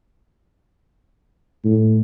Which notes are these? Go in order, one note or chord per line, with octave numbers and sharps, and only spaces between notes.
A2